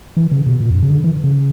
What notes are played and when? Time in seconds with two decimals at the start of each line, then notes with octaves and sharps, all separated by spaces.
0.17 E3
0.31 C#3
0.46 B2
0.60 A#2
0.70 E2
0.75 F#2
0.83 C#3
0.90 D3
1.04 E3
1.24 C#3